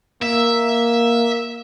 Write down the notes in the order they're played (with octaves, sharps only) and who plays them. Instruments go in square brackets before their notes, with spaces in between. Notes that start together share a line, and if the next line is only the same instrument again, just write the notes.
[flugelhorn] A#3 [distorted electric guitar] E5